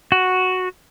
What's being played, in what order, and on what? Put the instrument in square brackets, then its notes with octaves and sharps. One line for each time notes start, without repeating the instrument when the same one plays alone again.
[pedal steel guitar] F#4